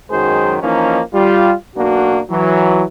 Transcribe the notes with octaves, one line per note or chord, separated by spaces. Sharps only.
F#2 D#3 F#3 G#3 G#4 C5
E3 F3 A#3 C#4 D#4
G3 F4
B1 A#3 D4 F#4
E3 F#3